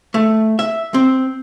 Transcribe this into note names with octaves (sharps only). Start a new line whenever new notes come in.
A3
E5
C4